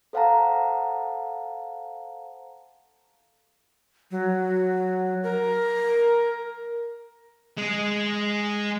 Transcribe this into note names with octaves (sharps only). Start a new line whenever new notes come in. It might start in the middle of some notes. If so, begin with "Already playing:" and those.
A4 C5 F5 F#5 A5 A#5
F#3
A#4
G#3